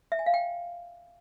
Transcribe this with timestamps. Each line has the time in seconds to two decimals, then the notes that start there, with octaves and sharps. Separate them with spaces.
0.12 E5
0.19 G#5
0.26 F5
0.34 G5